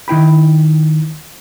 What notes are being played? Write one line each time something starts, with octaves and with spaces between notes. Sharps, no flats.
D#3 E4 G5 B5